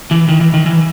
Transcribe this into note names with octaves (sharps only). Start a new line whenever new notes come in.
E3
D#3
E3
D#3
E3